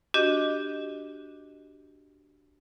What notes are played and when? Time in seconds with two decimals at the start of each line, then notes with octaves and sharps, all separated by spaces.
0.14 D4 F#4 G4 D#5